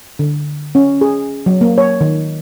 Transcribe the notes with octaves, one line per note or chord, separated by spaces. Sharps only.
D3
C#4
G#4
F#3
A#3
C#5
D#3